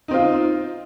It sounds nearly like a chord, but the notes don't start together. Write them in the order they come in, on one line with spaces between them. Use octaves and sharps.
D#4 C4 F4